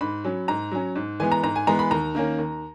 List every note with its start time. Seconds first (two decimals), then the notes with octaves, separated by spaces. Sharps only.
0.01 G#2 B5
0.24 F#3 C#4
0.48 G#2 A#5
0.72 F#3 C#4
0.96 G#2
1.20 E3 G#3 B3 G#5
1.32 A#5
1.43 G#2 A#5
1.56 G#5
1.67 E3 G#3 B3 A#5
1.79 B5
1.91 D#2 A#5
2.15 D#3 A#3 C#4
2.38 D#2